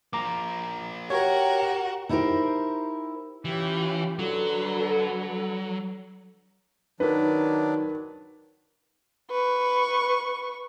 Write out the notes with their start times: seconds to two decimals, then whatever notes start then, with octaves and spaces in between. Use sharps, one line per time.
0.13 F3 A#3 A#5 D6
1.10 F#4 G4 A#4 C#5 F#5 C#6
2.09 D#4 E4 G4 A4 A#4 C5
3.45 E3 C#4 F4 G4
4.19 D3 F#3 A4 B4
7.00 D#3 F#3 D4 D#4 A#4 B4
9.30 B4 C#6